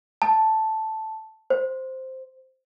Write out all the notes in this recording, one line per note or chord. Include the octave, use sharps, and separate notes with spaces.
A5
C5